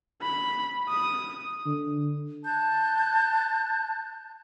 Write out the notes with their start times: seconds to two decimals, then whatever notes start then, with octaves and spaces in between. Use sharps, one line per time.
0.22 B5
0.89 D#6
1.66 D3
2.45 A5 F#6 G6